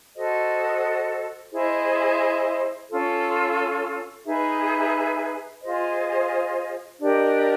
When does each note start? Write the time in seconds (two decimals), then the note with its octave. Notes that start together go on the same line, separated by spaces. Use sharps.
0.16 F#4 A4 C5 D#5
1.52 E4 G#4 C5 D#5
2.88 C#4 F4 A4
4.25 D#4 G#4 B4 E5
5.62 F4 G#4 C5 D#5
6.99 D4 G4 A#4 D#5